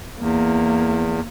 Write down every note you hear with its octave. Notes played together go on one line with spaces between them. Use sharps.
E2 A#3